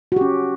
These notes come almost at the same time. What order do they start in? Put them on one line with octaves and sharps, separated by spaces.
F#4 G4 C#4